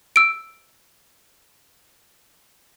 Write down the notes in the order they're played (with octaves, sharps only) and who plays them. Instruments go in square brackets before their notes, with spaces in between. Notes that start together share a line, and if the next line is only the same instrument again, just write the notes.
[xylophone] E6 D7